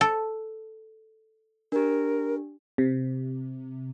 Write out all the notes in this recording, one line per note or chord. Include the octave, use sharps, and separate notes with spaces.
A4
D4 G4 A#4
C3